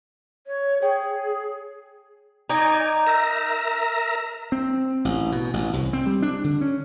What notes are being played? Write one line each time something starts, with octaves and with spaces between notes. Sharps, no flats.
C#5
G#4 C#5 G5
D#4 D5 G#5
A#4 E5 A#5
C4
A1
B2
A1
C2
C4
G3
D4
D3
C#4